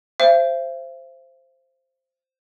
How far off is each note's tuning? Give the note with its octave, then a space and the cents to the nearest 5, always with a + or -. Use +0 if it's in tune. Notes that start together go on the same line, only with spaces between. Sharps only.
C5 +0 E5 +45 G5 +5